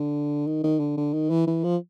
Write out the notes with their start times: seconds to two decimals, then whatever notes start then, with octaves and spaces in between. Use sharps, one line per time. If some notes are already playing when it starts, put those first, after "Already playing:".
Already playing: D3
0.47 D#3
0.64 D#3
0.80 D3
0.97 D3
1.14 D#3
1.30 E3
1.47 E3
1.64 F3